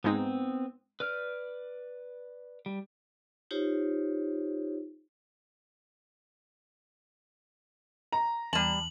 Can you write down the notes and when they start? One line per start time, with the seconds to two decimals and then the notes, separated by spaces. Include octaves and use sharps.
0.04 G#2 G#3 B3 C4 D#4
1.00 B4 D5 F6
2.66 G3
3.51 D#4 F4 G4 C5 C#5
8.12 A#5
8.53 E2 G3 A5 F#7